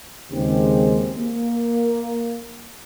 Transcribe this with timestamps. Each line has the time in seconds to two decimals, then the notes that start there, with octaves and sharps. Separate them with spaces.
0.31 D#2 C#3 G#3 C4 G4
1.16 A#3